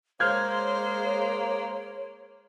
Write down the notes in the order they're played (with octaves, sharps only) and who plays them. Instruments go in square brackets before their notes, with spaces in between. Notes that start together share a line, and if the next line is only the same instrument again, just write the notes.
[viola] G#3 C5 [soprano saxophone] A#3 [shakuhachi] C#5 [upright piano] F6 G6 G#6